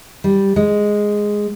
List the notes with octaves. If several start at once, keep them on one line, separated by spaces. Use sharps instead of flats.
G3
G#3